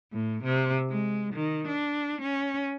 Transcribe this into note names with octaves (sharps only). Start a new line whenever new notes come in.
A2
C3
G#3
D#3
D4
C#4